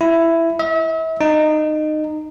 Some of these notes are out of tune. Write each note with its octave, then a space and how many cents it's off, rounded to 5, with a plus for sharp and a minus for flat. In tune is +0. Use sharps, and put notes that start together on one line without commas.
E4 +10
E5 -40
D#4 -20